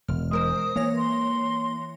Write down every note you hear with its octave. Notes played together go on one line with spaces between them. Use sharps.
E1 F6
G#3 A#4 C5 D#6
E3 A#3 C#5 A#6
C6